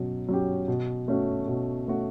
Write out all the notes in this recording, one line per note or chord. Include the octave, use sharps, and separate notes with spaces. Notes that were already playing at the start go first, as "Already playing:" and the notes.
Already playing: B2 F#3 C#4
F#3 C#4 G4
B2
A3 C#4 F#4
B2
A3 C#4 F#4